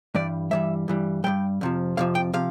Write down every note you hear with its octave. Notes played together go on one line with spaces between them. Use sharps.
G2 E3 G3 D5
G2 E3 G3 E5
G2 E3 G3
G2 E3 G3 G5
F2 C3 F3
F2 C3 F3 F5
G5
C3 F3 F5